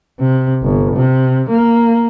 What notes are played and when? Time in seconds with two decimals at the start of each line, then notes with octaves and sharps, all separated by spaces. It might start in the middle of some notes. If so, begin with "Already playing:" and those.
0.20 C3
0.62 G1
0.96 C3
1.50 A#3